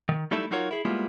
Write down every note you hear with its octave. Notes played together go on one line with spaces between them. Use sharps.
D#3
F#3 G3 A3 D#4 E4 A4
F#3 D#4 F4 F#4 A#4 C#5
E4 G#4
G3 G#3 A#3 B3 E4 F4